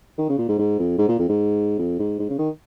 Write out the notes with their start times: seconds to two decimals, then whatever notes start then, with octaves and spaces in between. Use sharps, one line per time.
0.18 D#3
0.29 C#3
0.39 A#2
0.49 G#2
0.59 G#2
0.79 F2
0.98 G#2
1.09 A#2
1.19 F2
1.29 G#2
1.79 F2
1.99 G#2
2.19 G#2
2.30 C#3
2.39 D#3